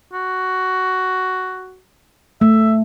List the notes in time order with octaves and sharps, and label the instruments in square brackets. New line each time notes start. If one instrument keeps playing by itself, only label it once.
[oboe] F#4
[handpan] A3 [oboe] E5